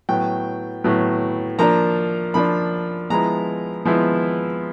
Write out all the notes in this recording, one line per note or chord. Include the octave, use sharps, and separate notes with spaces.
A2 F#3 B3 G5
A2 F#3 B3
F3 A#3 D4 A#5
F3 A#3 D4 B5
F3 G#3 B3 E4 A#5
F3 G#3 B3 E4